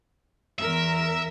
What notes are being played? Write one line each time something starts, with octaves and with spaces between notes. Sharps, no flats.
E2 A#4 E5